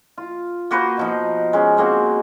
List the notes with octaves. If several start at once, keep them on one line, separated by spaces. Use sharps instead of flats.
F4
A#3 F#4 B4 C5
B2 F3 D#4
G#3 C#4
G#3 A#3 C4 F#4